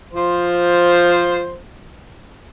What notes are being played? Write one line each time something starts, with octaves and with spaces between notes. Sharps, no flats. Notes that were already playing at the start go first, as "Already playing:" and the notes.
F3 C5